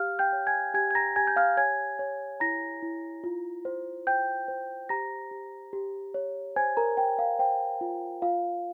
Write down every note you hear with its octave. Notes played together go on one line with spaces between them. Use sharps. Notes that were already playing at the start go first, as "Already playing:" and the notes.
Already playing: G4 F5 F6
G5 G6
C#5
G#5 G#6
G4 G#5 G#6
G#6
A#5 A#6
G4 G#5 G#6
G6
F5 F6
C#5 G#5 G#6
C#5
E4 A#5 A#6
E4
F4
C5
C5 G5 G6
C5
G4 A#5 A#6
G4
G4
C#5
C5 G#5 G#6
A#4 A#5
C5 G5
F5
C5 G5
F4
F4 F5